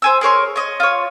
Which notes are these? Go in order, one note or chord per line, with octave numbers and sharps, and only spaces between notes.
C5 G#5 E6
G#4 A#4 C#5 C6
C#5 D#5
F4 C#5